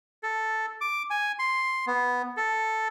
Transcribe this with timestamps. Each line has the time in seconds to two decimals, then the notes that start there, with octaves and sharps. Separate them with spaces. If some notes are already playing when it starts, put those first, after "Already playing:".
0.23 A4
0.81 D6
1.10 G#5
1.39 C6
1.87 B3
2.37 A4